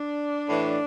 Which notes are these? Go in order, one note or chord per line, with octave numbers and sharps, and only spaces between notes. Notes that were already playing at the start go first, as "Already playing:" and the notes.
Already playing: D4
A2 E3